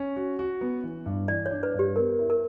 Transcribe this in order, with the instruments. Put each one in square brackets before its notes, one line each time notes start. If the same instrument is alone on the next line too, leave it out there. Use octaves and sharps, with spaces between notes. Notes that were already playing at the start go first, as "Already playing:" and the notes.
Already playing: [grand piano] C#4
F#4
F#4
B3
E3
G2
[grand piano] E3 [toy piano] D5
[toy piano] C#5
[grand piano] D4
[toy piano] B4
[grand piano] G2
[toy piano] G4
[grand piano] B3 [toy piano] A#4
[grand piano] E4
[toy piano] A#4